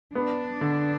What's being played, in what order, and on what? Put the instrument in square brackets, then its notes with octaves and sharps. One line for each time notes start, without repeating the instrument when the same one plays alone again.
[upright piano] B3 [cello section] D4
[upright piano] D3